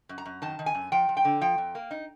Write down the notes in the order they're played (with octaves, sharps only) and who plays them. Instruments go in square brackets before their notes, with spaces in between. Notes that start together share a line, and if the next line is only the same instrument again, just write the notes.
[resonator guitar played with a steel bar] F#2
A#5
F#2
D#3 A5
D#3
G#5
F#2
F3 G5
F3
G5
D3
F3 G5
F2
A#3
D#4